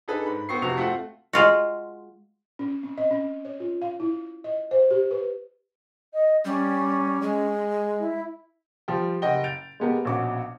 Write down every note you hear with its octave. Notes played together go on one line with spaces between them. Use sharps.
D4 D#4 G#4 A4 B4
G#2 B5
B3 C4 C#6 C7
F2 C3 F#4 C#6 F7
A3 C4 F4 F#4 F#5
G#3 F4 F#4
C#4
C4
D#5
C#4
C#5
F4
F5
E4
D#5
C5
G4
B4
D#5
G3 C#4
G#3
E4
F3 G3 G5
F#1 G4 D#5 F#5 G5 G7
G6 A6 D7 F7
G#3 A#3 B3 G4 A#4
A#1 B2 C#4 F#4 D6